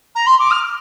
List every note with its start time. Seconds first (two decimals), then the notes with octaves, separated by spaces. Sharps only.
0.15 A#5
0.26 C6
0.39 D6
0.51 F6